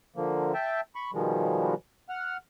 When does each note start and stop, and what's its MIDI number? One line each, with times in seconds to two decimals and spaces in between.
0.16 0.53 50
0.16 0.53 53
0.16 0.53 58
0.54 0.81 76
0.54 0.81 79
0.54 0.81 81
0.95 1.11 83
0.95 1.11 85
1.13 1.74 47
1.13 1.74 51
1.13 1.74 53
1.13 1.74 55
1.13 1.74 56
2.09 2.37 78
2.09 2.37 89